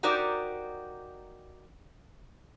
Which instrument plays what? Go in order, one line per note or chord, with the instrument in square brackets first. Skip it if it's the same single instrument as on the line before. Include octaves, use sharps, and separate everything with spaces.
[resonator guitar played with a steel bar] D#4 F#4 G4 A#4 C5 D5